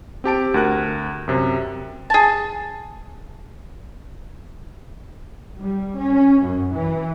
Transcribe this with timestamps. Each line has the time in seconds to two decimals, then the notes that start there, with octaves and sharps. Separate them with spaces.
0.24 C4 G4 A5 D7
0.54 D2 A#4 F#6
1.28 F#2 C3
2.10 G#4 A5
5.59 G3
5.97 C#4
6.42 F#2
6.74 E3